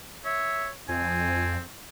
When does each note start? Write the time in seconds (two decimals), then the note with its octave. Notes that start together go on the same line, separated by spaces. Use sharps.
0.25 C#5 E5
0.89 F2 C4 G#5